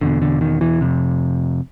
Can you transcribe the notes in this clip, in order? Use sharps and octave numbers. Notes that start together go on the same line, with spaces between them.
E2 B2 D3
D3
D#3
E3
F2 C3